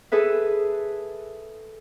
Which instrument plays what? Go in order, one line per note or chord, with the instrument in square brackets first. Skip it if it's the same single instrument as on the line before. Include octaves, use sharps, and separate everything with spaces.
[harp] G#4 A4 B4 E5